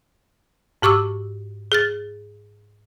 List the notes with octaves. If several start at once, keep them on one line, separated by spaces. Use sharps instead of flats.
G#2 G4 C#6 D6 E6
G#4 F6 A6